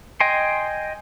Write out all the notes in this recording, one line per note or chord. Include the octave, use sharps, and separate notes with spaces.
D#5 G5 G#5 C6